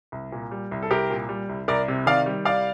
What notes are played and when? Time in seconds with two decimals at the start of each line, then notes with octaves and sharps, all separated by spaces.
0.12 C2
0.32 A#2
0.51 G3
0.71 C2
0.82 A4
0.91 C2 G4 A#4
1.10 A#2
1.29 G3
1.49 C2
1.68 C2 A#4 D5
1.88 C3
2.06 D#3 D5 F5
2.26 G3
2.45 C2 D5 F5